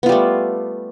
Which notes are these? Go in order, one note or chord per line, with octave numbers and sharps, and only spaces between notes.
G3 A3 B3 F4